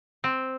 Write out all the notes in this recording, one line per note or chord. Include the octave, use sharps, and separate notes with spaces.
C4